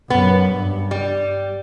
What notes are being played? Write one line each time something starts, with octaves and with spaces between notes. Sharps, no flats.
F#2 B3
G2
G3